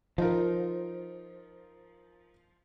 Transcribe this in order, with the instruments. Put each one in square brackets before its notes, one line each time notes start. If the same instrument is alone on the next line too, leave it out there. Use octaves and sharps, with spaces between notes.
[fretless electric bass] F3 [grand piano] D#4 F4 A#4